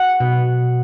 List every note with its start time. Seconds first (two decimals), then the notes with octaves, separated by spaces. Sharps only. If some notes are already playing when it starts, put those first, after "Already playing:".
Already playing: F#5
0.20 B2